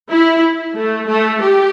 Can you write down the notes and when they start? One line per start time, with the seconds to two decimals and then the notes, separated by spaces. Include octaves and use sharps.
0.10 E4
0.75 A3
1.08 A3
1.41 G4